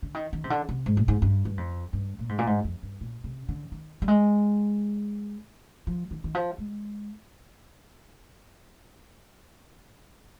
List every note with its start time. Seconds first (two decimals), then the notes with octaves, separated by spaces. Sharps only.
0.02 D3
0.14 D#3
0.33 D#3
0.44 C3
0.50 D3
0.69 C3
0.86 G#2
0.97 A#2
1.08 G#2
1.22 G2
1.45 G2
1.57 F2
1.93 G2
2.19 A#2
2.29 G#2
2.38 A#2
2.47 G#2
2.64 F2
2.83 G2
3.01 A#2
3.24 C3
3.48 D3
3.72 D#3
4.02 G3
4.08 G#3
5.87 F3
6.11 D#3
6.24 D#3
6.35 F3
6.58 G#3